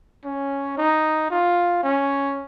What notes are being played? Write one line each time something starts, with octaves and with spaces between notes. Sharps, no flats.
C#4
D#4
F4
C#4